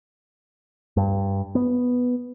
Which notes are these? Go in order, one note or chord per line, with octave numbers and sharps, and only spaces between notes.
G2
B3